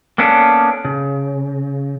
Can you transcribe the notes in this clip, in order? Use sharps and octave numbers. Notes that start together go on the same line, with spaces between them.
A#3 B3 C#4 D4 A4
C#3